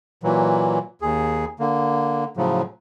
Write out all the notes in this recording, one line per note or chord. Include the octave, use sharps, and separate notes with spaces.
A#2 E3 F#3
D#2 G#4
D3 A#3
A2 C#3 F3 F#3